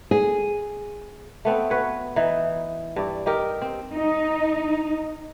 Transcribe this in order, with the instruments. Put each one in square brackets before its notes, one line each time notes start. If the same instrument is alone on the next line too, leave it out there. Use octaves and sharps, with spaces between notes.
[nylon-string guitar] G#4
[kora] A3 B3 C4
F#4 B4 C#5
E3 D#4
G2 D5
D#4 G4 A#4
C4
[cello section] D#4